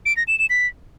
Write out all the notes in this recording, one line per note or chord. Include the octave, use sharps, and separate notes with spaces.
D7
A#6
E7
E7
B6